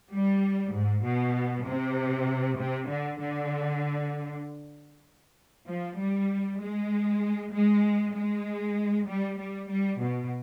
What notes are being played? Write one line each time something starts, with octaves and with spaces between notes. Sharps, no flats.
G3
G#2
B2
C3
C3
D3
D3
F3
G3
G#3
G#3
G#3
G3
G3
G3
B2